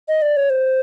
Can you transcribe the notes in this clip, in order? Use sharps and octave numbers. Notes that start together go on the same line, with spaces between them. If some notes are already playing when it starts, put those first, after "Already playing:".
D#5
D5
C#5
C5